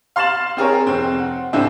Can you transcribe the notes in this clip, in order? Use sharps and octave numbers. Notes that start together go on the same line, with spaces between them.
F5 C6 F6 A6 E7 F#7
C4 G#4 A#4 C#5
F1 C4
F#5
C#2 A2 C4 D4 E5